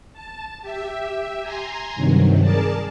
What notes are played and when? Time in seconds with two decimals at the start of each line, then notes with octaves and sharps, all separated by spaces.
0.13 A5
0.61 G4 E5
1.41 G#5 A#5 C6
1.96 G2 C3 D#3 F#3
2.40 G#4 A#4 D5 A5